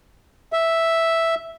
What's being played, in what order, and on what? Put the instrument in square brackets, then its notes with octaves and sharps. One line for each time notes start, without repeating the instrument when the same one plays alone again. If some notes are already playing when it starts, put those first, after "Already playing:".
[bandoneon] E5